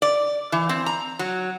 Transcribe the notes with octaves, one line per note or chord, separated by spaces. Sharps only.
D5
E3
C4
A#5
F#3